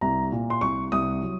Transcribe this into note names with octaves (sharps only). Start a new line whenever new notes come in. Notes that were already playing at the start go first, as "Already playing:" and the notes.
C2 A#5
A#2
C6
C2 C#6
C2 D#6
F#3